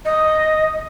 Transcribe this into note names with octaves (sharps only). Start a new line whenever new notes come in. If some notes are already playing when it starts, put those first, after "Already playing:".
D#5